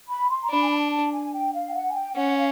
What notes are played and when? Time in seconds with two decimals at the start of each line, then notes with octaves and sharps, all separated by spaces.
0.09 B5
0.30 C6
0.43 A#5
0.50 D4 B5
0.62 G#5
0.71 A5
0.91 A5
1.12 G#5
1.33 G5
1.54 F5
1.69 G5
1.74 F#5
1.89 G#5
1.94 G5
2.15 C#4 F#5
2.36 F5